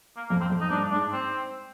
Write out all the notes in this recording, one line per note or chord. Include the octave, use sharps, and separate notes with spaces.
A#3
F2 A#3
C4
F2
D#4
G2 D4
G#2 D4
C4